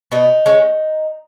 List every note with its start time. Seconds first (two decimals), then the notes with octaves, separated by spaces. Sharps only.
0.12 B2 D#4
0.46 G#3 C#4